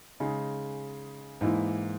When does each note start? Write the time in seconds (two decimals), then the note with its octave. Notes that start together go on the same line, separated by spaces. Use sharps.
0.20 C#3 G#3 D#4 G#4
1.41 G#2 E3 A#3 E4